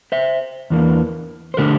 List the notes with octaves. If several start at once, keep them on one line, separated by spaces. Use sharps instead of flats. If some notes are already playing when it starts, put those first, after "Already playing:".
C5 E5
E2 E3 A#3 D4
C5
D3 A3 D4 G4 A#4